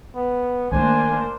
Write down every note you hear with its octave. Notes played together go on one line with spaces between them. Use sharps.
B3
D#3 A3 A#3 D4 C5 G#5